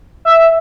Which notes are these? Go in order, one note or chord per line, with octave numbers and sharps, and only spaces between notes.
E5